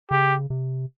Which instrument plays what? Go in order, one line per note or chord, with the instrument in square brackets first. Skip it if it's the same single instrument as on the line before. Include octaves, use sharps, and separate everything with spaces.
[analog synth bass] C#3 [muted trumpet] G4
[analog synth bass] C3